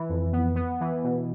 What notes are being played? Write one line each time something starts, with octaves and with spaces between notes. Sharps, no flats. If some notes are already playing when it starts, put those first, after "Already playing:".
Already playing: E3
F2
B3
B3
E3
B2